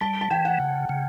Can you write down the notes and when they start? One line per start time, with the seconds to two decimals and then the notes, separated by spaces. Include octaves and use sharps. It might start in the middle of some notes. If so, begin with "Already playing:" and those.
0.01 G3 A5
0.21 A5
0.31 E3 G5
0.45 F#5
0.60 C#3
0.89 C#3